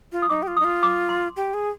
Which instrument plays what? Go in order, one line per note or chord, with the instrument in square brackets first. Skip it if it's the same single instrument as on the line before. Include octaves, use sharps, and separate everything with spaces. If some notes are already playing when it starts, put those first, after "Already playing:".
[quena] F4
[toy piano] D#6
[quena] D#4 [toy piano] D6
[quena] G4
F4
[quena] D#4 [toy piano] D#6
[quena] F4
[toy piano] D6
C6
[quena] G4
G#4